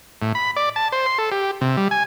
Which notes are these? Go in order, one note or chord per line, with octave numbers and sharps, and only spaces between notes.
A2
B5
D5
A5
C5
C6
A4
G4
C3
G3
G#5